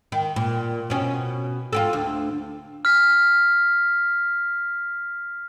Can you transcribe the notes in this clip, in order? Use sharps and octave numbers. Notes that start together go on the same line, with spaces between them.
D#3
A#2
B2 C#4
F4 G4 A4
D2
F6 B6